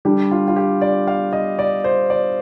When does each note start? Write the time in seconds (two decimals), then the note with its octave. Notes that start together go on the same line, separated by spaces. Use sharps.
0.05 D3 G3 D4 G4
0.31 F4
0.48 F4
0.56 G4
0.81 D5
1.07 F5
1.33 D#5
1.59 D5
1.84 C5
2.10 D5